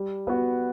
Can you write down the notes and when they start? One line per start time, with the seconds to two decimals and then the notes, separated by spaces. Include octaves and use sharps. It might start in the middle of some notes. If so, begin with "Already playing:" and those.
Already playing: G3
0.27 B3 F#4